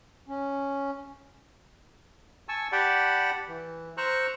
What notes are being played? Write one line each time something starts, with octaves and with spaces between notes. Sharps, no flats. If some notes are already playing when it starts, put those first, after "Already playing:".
C#4
G#5 A5 C#6 E6
G4 D5 F#5 G5 A5 B5
E3
C5 A#5 C#6 E6 F#6